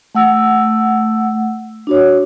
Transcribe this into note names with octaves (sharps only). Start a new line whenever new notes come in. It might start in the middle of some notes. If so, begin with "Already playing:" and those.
A3 F#5 E6
D4 F#4 C#5